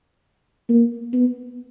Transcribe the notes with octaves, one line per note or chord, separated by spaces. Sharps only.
A#3
B3